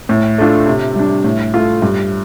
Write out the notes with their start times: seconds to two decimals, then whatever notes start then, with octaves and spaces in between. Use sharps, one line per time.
0.09 A2
0.38 A3 D4 F4
0.66 C3
0.96 G3 D4
1.24 A2
1.54 A3 F4
1.82 G2